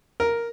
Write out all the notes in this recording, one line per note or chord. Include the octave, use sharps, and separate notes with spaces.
A#4